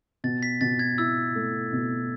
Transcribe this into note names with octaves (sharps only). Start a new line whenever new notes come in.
B2 A6
B6
B2 A6
G#6
E4 E6
A3
B2